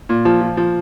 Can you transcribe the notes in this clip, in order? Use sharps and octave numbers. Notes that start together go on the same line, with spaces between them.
A#2
F3
F3
F3